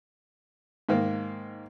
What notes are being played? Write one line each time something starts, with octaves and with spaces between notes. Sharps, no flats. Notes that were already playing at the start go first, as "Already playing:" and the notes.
G#2 D#3 A#3